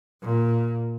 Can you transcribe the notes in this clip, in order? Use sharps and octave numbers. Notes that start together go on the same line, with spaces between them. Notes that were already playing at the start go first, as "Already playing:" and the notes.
A#2